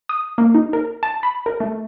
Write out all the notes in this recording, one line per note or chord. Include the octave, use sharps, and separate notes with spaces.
D#6
A#3
D#4
A#4
A5
B5
A#4
A3